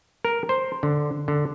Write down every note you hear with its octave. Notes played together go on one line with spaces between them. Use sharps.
A#4
C5
D3
D3